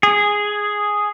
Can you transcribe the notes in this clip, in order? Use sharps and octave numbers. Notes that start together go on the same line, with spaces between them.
G#4